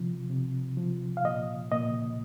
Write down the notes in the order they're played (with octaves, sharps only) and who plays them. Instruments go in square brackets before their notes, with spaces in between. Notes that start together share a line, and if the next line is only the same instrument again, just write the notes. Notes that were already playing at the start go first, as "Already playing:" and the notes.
Already playing: [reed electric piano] C3 F3
C3
F3
F5
A#2 D#5
A#2 D#5